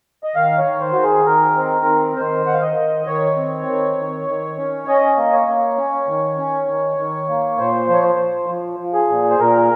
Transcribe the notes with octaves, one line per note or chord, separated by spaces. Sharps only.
D#5
D#3 F5
C#5
D#3
C5
D#3 F#4
G#4
D#3 A#4
C4
D#3
D#3 C5
D#3 F#5
F5
D#5
D#3
D#3 C#5
C4
D#3
D#3
D#3
C#4
C#4 D#5
A#3
C#5
A#3
C#4
D#3
C#4
D#3
D#3
A#3
A#2 C5
F3 C#5
C5
F3
F3
F3
G#4
A#2
C5
A#2 A#4